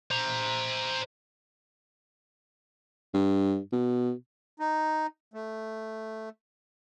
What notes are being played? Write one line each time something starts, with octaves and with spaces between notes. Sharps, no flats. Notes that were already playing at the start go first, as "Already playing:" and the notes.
C5 A#5
G2
B2
D#4
A3